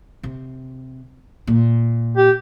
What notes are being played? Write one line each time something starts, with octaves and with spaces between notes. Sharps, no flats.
C3
A#2
G4